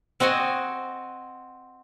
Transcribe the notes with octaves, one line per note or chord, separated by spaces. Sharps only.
C4 F#4 D#5 F#5 G#5